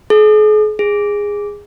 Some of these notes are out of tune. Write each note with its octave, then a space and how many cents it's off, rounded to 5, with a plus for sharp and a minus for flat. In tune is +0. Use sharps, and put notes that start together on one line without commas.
G#4 +45
G#4 -15